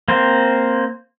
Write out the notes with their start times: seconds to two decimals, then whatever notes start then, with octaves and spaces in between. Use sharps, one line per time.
0.08 A#3 C4 C5